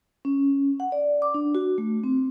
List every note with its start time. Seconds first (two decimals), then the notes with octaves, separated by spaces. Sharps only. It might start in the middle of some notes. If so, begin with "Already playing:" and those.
0.25 C#4
0.80 F#5
0.92 D5
1.22 D6
1.34 D4
1.55 F#4
1.78 A3
2.04 C4